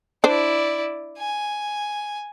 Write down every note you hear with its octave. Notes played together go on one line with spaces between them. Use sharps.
D4 E4 C5 D5
G#5